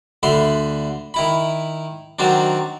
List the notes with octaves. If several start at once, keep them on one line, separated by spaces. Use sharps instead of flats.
D2 D3 E5 B5 C6
D#3 E4 B5
D#3 F#3 C4 D4